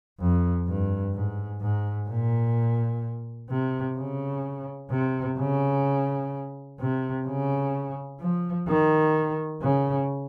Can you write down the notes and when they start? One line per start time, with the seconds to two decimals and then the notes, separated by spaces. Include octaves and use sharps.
0.20 F2
0.68 G2
1.14 G#2
1.61 G#2
2.09 A#2
3.50 C3
3.98 C#3
4.91 C3
5.39 C#3
6.80 C3
7.27 C#3
8.21 F3
8.68 D#3
9.62 C#3